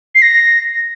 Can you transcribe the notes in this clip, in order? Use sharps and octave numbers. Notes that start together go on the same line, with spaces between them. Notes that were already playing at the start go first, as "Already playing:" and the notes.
C7
A#6